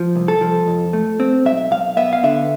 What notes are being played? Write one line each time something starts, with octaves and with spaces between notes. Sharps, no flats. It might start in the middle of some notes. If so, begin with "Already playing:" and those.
Already playing: F3
C2
A4
F3
F2
A3
C4
B1 E5
B1 F5
B3 E5
F5
D3 E5